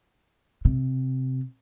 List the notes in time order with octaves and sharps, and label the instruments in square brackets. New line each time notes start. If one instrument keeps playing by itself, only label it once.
[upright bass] C3